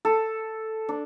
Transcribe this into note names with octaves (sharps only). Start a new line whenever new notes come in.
A4
D4